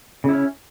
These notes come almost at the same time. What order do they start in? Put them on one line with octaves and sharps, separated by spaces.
C#3 E4 C#4